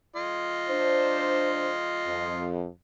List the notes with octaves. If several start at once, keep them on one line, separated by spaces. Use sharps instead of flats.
F4 D#5
D4 C5
F2